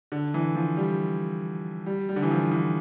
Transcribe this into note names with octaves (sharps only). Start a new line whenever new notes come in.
D3
E3
F3
G3
G3
G3
D3
E3
F3
E3